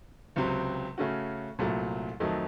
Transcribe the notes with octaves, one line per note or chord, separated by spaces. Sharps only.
C#2 C3 F#3 C4
C#3 A3 C#4 F#4
C2 A#2 F#3 A3
F2 D#3 F#3 A3 D#4